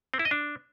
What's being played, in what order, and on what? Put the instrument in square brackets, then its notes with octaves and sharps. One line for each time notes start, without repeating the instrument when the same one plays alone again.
[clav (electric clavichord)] C4
E4
D#5
D4